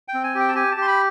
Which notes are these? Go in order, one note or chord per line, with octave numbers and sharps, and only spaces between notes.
G5
C4
G#5
G4
G5
A5
G4 G#5
A5
G4 C6
B5